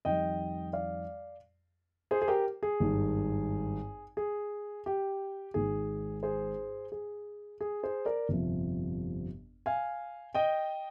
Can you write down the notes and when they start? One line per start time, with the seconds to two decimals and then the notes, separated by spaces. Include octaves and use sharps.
0.05 F2 D#3 G3 D#5 G5
0.73 D5 F5
2.11 G#4 C5
2.22 G#4
2.28 G4 A#4
2.63 G#4
2.80 G#1 G2 D#3
4.17 G#4
4.86 G4
5.54 G#1 G#2 D#3 G#4
6.23 G#4 C5
6.92 G#4
7.61 G#4
7.83 G#4 C5
8.06 A#4 D5
8.29 G1 F2 C3 F3
9.66 F5 G#5
10.34 D#5 G5